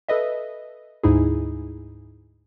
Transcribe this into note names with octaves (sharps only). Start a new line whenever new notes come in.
A4 B4 D#5 E5
D2 G#2 D#4 E4 G#4